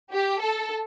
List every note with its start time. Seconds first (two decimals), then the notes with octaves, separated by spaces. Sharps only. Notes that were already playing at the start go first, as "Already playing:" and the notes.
0.11 G4
0.40 A4